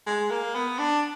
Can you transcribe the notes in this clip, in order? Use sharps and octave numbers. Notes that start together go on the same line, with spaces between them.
G#3
A#3
B3
D4